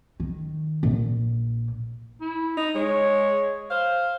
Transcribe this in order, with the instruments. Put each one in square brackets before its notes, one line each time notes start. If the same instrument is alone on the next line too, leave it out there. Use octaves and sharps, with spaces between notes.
[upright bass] D#3
A#1
[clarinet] E4
[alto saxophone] D#4
[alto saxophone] G#3 [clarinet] C#5
[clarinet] C5 [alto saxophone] F5